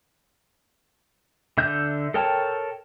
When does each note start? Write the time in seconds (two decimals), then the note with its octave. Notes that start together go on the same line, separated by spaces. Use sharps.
1.58 D3 E5 G6
2.14 A4 A#4 C#5 G5 A5